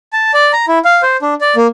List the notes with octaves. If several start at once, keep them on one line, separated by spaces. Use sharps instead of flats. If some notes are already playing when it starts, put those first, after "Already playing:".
A5
D5
A#5
E4
F5
C5
D4
D5
A#3